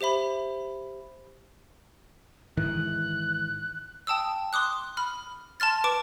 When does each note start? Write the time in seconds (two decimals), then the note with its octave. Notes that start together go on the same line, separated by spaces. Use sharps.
0.01 G4 C5 E5 B5
2.57 G#2 D#3 E3 F#6
4.07 G5 A5 D#6 E6
4.53 C6 D6 D#6 F#6
4.97 B5 F6
5.60 A5 C6 F6 A6
5.84 B4 D6 D7 E7